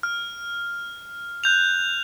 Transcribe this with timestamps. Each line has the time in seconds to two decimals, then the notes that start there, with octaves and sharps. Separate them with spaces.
0.03 F6
1.44 F#6 G6 F7